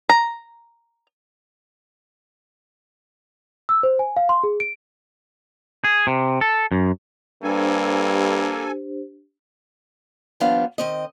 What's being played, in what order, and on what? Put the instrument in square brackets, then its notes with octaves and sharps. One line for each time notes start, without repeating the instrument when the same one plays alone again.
[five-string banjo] A#5
[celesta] E6
C5
G#5
F5
C6
G#4
D7
[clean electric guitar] G#4
C3
A4
F#2
[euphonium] G2 [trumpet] A#3 [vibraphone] D4 G4 C5 [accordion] A4 G#5
[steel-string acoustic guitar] D#2 F3 G3 B3 D4 F5
D#3 C4 D#5